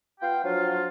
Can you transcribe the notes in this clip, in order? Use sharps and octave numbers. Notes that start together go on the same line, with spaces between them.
B3 F4 F5 G5
F3 F#3 D4 F4